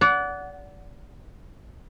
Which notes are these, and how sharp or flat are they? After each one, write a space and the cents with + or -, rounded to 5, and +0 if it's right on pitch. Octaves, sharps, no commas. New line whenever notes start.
D5 -30 F#5 +0